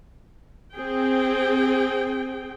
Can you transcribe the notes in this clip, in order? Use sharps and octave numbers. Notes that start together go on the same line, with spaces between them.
C4 G#4 G5